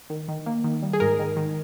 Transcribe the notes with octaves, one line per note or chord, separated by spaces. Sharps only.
D#3
D#3
A#3
D#3
G3
G#4
G#2 A#4
D#3
D#3